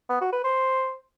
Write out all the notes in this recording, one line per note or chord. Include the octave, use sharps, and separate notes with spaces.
B3
F#4
B4
C5